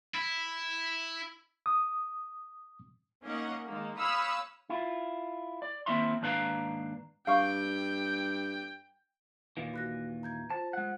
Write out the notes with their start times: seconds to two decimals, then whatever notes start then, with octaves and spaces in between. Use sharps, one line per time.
0.14 E4
1.66 D#6
3.24 A#3 C#4 D#4 D#5 F#5
3.66 D#3 G#3 A#3
3.98 C#5 F5 B5 D#6 E6 F#6
4.69 E4 F4
5.62 D5
5.86 D#3 A#3 C4 E4 E5 C6
6.21 D#2 G#2 D4 B4 F5 A#5
7.27 G2 F5 G5 C#6
9.57 D#2 A#2 E3
9.74 F#4 F#6 A#6
10.23 A#5 G6 G#6
10.50 F4 C5 A5
10.73 G#3 F#5